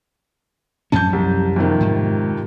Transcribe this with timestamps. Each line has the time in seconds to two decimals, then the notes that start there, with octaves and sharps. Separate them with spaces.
0.92 F#2 F3 C#4 A5 G6
1.13 C2
1.56 F2 C3 D#3
1.80 G#2